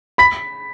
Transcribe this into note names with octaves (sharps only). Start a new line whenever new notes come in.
B5 B6